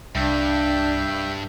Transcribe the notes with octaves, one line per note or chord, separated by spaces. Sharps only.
C2 G2 D4 E5 G5